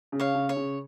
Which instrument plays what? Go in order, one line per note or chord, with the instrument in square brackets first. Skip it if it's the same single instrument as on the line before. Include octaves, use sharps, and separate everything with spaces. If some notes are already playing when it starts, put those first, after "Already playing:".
[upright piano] C#3
[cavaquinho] C#5 F5
[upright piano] C#3
[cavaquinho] C#5
[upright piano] C#3